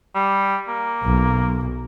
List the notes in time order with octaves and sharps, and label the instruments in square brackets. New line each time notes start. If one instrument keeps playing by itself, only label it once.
[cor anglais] G3
A#3
[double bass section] B1